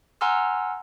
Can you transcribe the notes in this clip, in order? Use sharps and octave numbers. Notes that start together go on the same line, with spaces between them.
F#5 G#5 A#5 C6 E6 F6